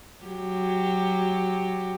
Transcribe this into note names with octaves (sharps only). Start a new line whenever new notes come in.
F#3 G4